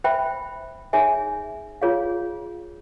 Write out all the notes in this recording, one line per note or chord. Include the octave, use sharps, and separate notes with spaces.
C5 E5 G5 B5
D#4 G#4 C#5 E5 G#5
F4 G#4 C#5 F5